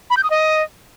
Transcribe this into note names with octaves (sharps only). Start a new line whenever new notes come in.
B5
G6
D#6
D#5